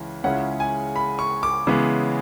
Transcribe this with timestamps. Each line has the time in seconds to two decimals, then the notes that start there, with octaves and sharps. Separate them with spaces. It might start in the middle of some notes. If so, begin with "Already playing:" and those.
Already playing: C#2 C#3 E3
0.24 C#2 C#3 G#3 C#4 E4 F#5
0.60 G#5
0.96 B5
1.19 C#6
1.43 D6
1.67 C#3 E3 G#3 B3